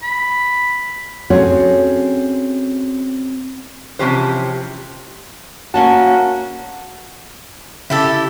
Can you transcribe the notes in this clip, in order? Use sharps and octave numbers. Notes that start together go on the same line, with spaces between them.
B5
C4 C#4 F#4 G#4 A4 C#5
C3 E3 F3 C#4 G4 C5
A#3 C#4 F#4 A5
C#3 E4 G4 A4